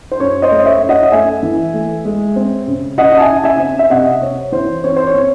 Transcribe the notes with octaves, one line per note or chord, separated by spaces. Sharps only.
C5
F#2 C#5
C5 D#5
A3
C#5 E5
F#2
D#5 F#5
A3 E5 G#5
E3
A3
G#3
C4
C#3
C#3 D#5 F#5
A5
E5 G#5
C#3
E5 G#5
C4
E5
C3 D#5 F#5
C4 C#5
E3 C5
C4 C#5
C5
C#5
C4